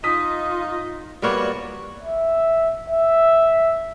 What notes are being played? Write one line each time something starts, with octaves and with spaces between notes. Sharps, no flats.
D#4 F4 D#6 B6
G3 A#3 B3 F4 F#4 C#5 D5
E5
E5